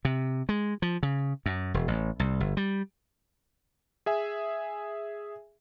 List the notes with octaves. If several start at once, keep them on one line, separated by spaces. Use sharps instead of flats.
C3
G#3
F3
C#3
F#2
E1
A1
C2
G1
G3
G#4 E5 G#5